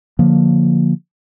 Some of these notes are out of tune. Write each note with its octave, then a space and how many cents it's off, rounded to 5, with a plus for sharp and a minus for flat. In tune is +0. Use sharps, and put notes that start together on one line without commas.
D3 +0 F3 +15 A#3 +0